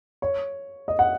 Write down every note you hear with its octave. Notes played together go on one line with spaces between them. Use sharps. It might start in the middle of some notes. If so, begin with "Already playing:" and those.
C#5
D#5
F#5